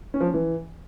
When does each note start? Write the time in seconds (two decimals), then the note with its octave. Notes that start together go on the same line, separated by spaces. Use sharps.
0.14 C#4
0.21 F3
0.27 C#4
0.34 E3